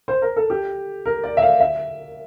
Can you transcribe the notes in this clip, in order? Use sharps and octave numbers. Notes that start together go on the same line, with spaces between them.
C5
A#4
A4
G4
A#4
D5
E5
F5
E5